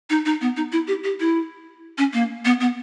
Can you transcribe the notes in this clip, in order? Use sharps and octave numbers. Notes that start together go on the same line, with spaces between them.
D#4
D#4
B3
D#4
E4
G4
G4
E4
C#4
A#3
B3
B3